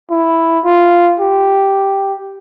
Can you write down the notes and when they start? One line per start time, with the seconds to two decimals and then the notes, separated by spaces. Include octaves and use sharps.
0.10 E4
0.65 F4
1.20 G4